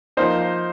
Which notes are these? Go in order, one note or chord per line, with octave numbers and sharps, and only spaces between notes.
F3 A#3 D#4 C5